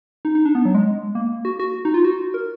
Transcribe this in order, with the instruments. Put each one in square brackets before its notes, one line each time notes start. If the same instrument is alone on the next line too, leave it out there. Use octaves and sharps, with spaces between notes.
[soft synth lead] D#4
D#4
D4
B3
F#3
G#3
A#3
F#4
F#4
D#4
F4
F#4
A#4